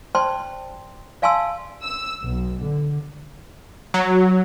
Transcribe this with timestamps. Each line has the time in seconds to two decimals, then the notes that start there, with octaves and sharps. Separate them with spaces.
0.15 C5 D5 G5 A5 C6
1.22 D5 F5 G#5 A5 C6 E6
1.82 E6
2.23 B1
2.61 D3
3.94 F#3